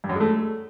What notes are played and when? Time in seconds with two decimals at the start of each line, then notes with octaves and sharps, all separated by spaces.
0.04 G2
0.09 F#2
0.15 G#3
0.20 A3